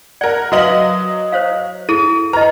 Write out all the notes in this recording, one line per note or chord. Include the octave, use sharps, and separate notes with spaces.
A#4 D5 F#5
F#3 F#4 B4 D#5 F5 F#7
C5 C#5 F5
E4 G#4 A4 D#7
B4 D#5 A#5